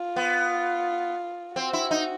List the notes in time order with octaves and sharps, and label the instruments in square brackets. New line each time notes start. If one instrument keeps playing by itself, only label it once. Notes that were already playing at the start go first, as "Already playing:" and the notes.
Already playing: [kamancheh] F4
[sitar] B3
[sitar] C4 [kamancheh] F#4
[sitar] E4
D#4